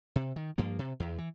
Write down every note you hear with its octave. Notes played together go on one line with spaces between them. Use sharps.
C3
D#3
G2 F3 A#3
C3
E2
E3